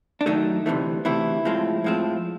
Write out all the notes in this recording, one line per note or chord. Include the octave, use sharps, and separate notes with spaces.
D4
F#2 D#3 F#3 A3 D#4
D2 C3 E3 A3
D2 C3 E3 A3 E4
A2 F3 G#3 C4
A2 F3 G#3 C4